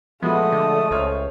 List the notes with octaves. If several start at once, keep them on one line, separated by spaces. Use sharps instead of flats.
A#2 F3 G#3 A3 B3 F#4 D#5 D#6
D3
C#2 C5 C#5 F6